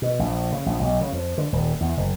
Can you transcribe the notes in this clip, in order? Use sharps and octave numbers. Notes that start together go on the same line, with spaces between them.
B2
A#1
C#3
A#1
B1
C#3
F2
D3
D#1
E2
F#1